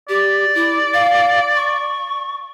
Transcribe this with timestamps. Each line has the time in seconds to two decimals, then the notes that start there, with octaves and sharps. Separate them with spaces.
0.09 G4 D5
0.55 E4
0.94 F5
1.55 C#6